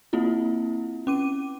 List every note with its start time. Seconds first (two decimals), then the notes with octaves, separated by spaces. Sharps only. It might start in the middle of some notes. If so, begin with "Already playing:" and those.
0.13 A#3 C4 E4 F4
1.07 C#4 D6 D#7